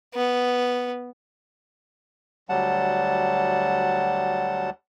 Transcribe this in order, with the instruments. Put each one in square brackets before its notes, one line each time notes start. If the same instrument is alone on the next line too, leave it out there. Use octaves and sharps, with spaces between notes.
[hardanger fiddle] B3
[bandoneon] D2 F#3 G3 F#5 A5